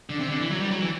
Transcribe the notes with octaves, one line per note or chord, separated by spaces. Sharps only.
D3
C3
D3
E3
F#3
G3
F#3
E3